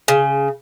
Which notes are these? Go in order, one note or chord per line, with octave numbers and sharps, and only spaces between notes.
C#3